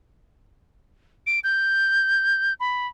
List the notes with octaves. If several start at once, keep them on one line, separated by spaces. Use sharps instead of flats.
D7
G6
B5